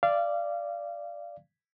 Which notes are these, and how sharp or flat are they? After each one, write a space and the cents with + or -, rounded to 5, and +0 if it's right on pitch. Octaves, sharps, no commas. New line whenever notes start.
D5 +0 F5 -25